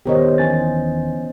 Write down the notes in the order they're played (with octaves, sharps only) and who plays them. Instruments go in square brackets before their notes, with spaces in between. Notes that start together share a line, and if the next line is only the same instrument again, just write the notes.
[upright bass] D#1 D#3 [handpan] B3 C5 D#5 [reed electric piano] G4 A#4 C#5
[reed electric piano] E3 G#5 A6 [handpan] C#4